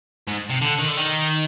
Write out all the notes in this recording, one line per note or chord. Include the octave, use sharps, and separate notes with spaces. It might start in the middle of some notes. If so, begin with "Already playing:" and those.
G#2
C3
D3
D#3
D3
D#3